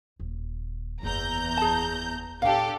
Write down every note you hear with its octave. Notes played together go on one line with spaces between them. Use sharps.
D#1
F#1 E2 A#5 G6
G#4 A5
A#2 B3 D4 G4 A4 F5 G5